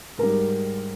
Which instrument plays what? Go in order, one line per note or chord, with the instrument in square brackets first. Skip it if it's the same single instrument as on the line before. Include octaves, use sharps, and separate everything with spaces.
[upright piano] G#2 G3 A#4